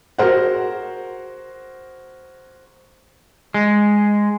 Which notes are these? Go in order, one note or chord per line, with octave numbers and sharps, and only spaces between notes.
F#4 G#4 A#4 C5 F#5
G#3